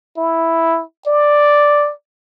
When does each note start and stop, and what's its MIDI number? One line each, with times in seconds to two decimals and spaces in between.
0.17 0.83 64
1.07 1.92 74